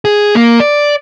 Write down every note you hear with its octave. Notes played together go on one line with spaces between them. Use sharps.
G#4
A#3
D5